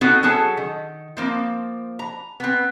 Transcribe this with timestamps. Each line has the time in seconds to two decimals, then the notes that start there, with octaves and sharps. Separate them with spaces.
0.01 B3 C4 D#4 F#4 A4 C5
0.23 F#3 C#4 G#4 A4 A5
0.57 D#3
1.17 F3 A#3 C4
1.99 A#5
2.40 B3 C4